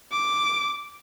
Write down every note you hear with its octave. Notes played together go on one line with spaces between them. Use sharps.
D6